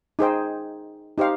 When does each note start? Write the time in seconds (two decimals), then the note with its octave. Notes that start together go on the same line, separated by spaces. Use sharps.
0.19 D#4 G#4 C5 G5
1.18 D#4 G4 C5 F5